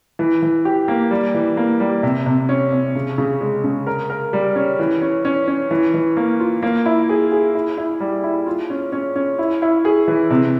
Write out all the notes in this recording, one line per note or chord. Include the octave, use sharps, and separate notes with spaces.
E3
E3
G4
A#3
G3
E3
A#3
G3
C3
C3
C#4
C3
C#3
C#3
G#3
C#3
A#4
A#4
G3
C#4
E3
C#4
C#4
C#4
E3
E3
A#3
F4
A#3
E4
G#4
G#4
E4
E4
G3
E4
F4
C#4
C#4
C#4
E4
E4
G#4
E3
C3